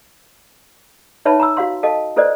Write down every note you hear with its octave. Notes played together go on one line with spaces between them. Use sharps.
D#4 B4 C#5 E5 A5 B5
A#5 B5 E6
F#4 F5 C6
A4 D#5 F5 A5
E4 A4 B4 C5 D5 D#5